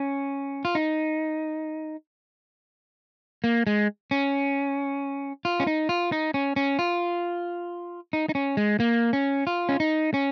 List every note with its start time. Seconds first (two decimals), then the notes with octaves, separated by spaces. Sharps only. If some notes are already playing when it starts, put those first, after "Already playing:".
Already playing: C#4
0.65 F4
0.75 D#4
3.44 A#3
3.67 G#3
4.11 C#4
5.45 F4
5.60 C#4
5.67 D#4
5.89 F4
6.12 D#4
6.34 C#4
6.56 C#4
6.79 F4
8.13 D#4
8.29 D#4
8.35 C#4
8.57 G#3
8.80 A#3
9.13 C#4
9.47 F4
9.69 C#4
9.80 D#4
10.14 C#4